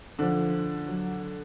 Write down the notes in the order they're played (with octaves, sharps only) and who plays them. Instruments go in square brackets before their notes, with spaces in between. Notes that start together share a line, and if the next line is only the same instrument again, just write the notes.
[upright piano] D3 D4 [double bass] F3
[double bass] F#3